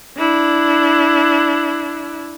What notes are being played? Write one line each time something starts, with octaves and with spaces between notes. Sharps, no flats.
D4 E4